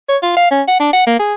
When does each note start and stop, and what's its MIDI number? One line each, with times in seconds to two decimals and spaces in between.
0.09 0.17 73
0.23 0.36 65
0.37 0.51 77
0.51 0.62 61
0.68 0.78 78
0.80 0.91 62
0.93 1.04 78
1.07 1.15 58
1.19 1.34 68